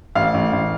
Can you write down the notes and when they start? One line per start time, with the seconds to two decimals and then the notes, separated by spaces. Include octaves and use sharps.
0.15 A1 F5
0.34 A1
0.53 A1